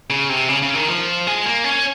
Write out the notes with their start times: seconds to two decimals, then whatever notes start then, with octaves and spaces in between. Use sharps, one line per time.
0.10 C#3
0.29 C3
0.49 C#3
0.62 C#3
0.75 D#3
0.88 F3
1.27 G#3
1.46 A#3
1.64 C#4